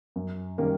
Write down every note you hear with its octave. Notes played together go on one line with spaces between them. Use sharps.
F#2
D#3 G3 A#3 C#4